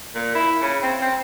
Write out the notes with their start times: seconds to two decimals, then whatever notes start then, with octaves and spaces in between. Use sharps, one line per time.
0.15 A#2
0.35 E4
0.61 C#3
0.82 C4
1.01 C4